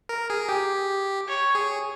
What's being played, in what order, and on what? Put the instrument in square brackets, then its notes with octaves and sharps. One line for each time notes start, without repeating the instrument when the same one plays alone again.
[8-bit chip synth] A#4
G#4
G4
[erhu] C#5
[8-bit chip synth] G#4